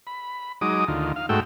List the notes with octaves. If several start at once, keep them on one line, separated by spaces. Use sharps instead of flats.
B5
F#3 G#3 D#4 D6 D#6
D2 D#3 F4
F5
G#2 A3 F#4 G5 E6